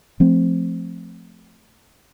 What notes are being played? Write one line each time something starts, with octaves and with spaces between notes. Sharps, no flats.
F3 A3 C4